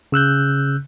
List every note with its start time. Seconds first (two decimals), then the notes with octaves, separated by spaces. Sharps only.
0.12 C#3 E6 F#6 G6